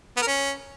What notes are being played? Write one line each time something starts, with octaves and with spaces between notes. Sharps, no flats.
B3
A#4
C#4